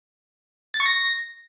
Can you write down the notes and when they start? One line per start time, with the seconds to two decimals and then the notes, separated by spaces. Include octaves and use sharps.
0.74 A6
0.80 C#6
0.86 A#6